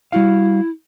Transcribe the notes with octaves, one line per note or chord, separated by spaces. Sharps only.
G3 E4 F#4 F5